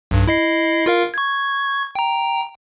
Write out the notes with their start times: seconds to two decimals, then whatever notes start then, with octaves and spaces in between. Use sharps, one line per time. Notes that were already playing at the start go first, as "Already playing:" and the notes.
0.11 B1 G2
0.27 E4 D#5 C7
0.86 F4 A#4 F5
1.14 C#6 G#6
1.95 G5 A#5